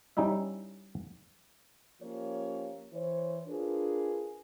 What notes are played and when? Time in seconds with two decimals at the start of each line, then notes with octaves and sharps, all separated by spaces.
0.17 G3 C#4 D#4 E4 E5
2.01 F3 A#3 C#4 G4 C#5
2.93 E3 C5 C#5
3.48 D4 F4 G#4 A#4 B4